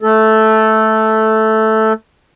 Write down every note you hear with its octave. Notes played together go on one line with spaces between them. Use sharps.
A3 A4